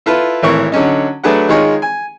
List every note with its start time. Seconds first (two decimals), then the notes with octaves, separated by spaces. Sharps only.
0.06 E4 F4 A4 B4
0.43 G#1 A2 E3 A#4 C#6
0.72 D3 F#3 C#4 D#4
1.23 F#3 A3 D4 G#4 B4 F#5
1.49 D#3 G#3 D#4 F4 G#4 C#5
1.82 G#5